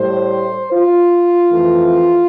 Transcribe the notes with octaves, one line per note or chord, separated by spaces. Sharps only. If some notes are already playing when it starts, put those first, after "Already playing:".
Already playing: A2 G3 C5
F4
F2 E3 A3